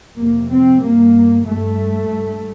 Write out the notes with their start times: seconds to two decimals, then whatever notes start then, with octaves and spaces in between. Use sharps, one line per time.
0.19 F2 C3 A#3
0.50 C4
0.82 G2 A#3
1.44 G2 A3
2.08 G2